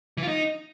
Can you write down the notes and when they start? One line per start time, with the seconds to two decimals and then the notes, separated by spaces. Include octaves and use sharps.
0.17 E3
0.23 F4
0.28 D#4